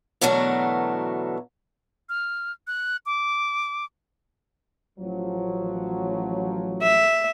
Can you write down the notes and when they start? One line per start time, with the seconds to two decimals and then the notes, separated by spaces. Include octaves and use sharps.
0.21 B2 D3 E3 F#3 A3 A#4
2.09 F6
2.67 F#6
3.06 D6
4.99 A1 F3 F#3
6.83 E5